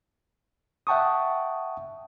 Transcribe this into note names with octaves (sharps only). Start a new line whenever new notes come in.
E5 F#5 G5 A5 C#6 D#6